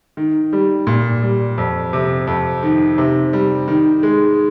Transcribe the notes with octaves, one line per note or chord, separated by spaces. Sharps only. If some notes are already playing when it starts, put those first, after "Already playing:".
D#3
G3
A#2
G3
F2
C3
F2
D#3
C3
G3
D#3
G#3